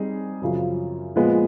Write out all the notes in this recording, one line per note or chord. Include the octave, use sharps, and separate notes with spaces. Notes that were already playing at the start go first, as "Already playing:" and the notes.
Already playing: G3 C4 D#4 G#4
F#2 C#3 F3
A#2 F3 G#3 B3